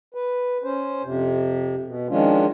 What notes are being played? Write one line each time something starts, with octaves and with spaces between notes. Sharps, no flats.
B4
C#4 C5
F2 C3
B2
D#3 F3 G#3 C#4 D4 F4